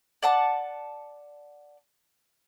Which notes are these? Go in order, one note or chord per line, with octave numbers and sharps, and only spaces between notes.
D5 F#5 A5